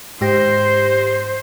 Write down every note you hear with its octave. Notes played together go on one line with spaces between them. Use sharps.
G#2 G4 C5 A#6